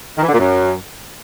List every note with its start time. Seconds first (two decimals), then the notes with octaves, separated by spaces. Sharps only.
0.18 D#3
0.23 E3
0.29 D3
0.34 A#2
0.39 F#2